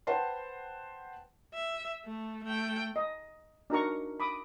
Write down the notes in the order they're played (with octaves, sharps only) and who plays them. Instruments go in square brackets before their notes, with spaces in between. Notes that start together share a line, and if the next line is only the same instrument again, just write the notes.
[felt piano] B4 C5 F#5 G5 A5 C6
[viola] E5
A3
A3 G5
[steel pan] D#5
D4 D#4 F#4 A#4 A#5 C#6
B5 D6 D#6